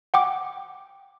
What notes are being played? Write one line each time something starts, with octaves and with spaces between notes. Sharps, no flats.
F#5 G5 D6